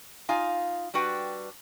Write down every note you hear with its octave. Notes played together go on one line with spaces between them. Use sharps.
D#4 F4 F5 G#5
G3 D4 F#4 B4 G5